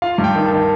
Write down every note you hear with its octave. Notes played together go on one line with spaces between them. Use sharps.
F4 F5
G2
G5
D#3
A5
D#3